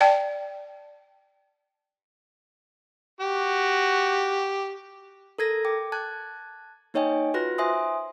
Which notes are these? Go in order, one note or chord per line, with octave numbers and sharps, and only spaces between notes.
D5 G5 A5
F#4 G4
A4 A#4 G#6 A#6
G5 D6
A5 F#6 G#6
A#3 D#4 C#5 D#5 G5 G#5
F4 F#4 B4 F#6 A#6
C5 E5 G#5 C6 D#6